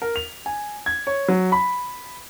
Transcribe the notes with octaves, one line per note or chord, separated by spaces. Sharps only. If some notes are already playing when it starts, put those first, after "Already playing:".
A#4
F7
G#5
G#6
C#5
F#3
B5